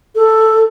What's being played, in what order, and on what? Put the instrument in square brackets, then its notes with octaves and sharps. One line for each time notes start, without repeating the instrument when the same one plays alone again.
[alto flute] A4